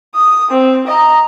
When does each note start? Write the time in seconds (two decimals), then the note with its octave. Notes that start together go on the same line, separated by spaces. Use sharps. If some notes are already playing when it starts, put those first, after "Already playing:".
0.15 D#6
0.51 C4
0.87 D#5 A#5